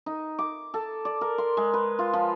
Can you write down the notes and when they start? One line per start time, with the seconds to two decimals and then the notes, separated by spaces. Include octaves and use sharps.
0.06 D#4
0.39 D6
0.74 A4
1.05 D5
1.21 A#4
1.38 C6
1.57 G#3
1.74 B4
1.99 F4
2.13 F3